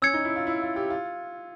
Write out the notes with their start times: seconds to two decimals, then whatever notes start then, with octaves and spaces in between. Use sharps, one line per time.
0.02 C#4 E6 G#6 C#7
0.14 D#4
0.25 E4
0.36 F4
0.47 E4
0.62 F4
0.76 G4
0.90 F4